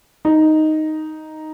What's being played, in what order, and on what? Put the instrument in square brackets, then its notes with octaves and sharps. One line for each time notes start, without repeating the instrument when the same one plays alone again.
[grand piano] D#4